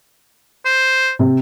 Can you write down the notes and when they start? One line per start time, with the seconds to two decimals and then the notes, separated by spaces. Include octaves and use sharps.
0.65 C5
1.19 C3